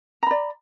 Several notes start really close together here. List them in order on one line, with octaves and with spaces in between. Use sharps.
A#5 B5 D5